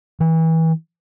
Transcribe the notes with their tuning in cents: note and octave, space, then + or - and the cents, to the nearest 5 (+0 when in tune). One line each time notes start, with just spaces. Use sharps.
E3 -25